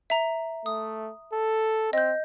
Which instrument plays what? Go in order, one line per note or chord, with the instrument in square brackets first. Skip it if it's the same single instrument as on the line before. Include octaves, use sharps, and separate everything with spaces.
[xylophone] E5 A#5
[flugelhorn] A3 [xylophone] D#6
[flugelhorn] A4
[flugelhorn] C4 [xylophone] D#5 G6